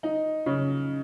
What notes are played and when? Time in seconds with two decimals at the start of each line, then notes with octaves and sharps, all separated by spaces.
0.03 D#4
0.46 C#3